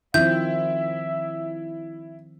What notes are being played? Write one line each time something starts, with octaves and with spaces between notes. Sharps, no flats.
D#3 F3 C4 E4 E5 G6